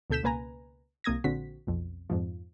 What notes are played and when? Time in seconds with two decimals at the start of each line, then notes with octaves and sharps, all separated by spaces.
0.10 D2 B2 A4 G6 B6 E7
0.23 C#2 B2 A#3 B4 G#5 A#5
1.04 C2 A#3 D#6 G#6 A#6
1.24 A#1 D3 C4 F#4 B6
1.67 B1 F2
2.10 F2 G#2 F3